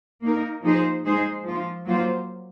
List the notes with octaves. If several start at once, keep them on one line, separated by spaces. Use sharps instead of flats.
A#3 D#4 A#4
F3 A#3 D#4 G#4 C5
G#3 D#4 G#4 C5
F3 A#3 F4
F#3 A#3 F4 C5